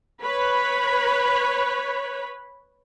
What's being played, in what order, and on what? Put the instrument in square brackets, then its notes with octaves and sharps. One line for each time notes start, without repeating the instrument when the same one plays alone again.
[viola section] B4 C#5 B5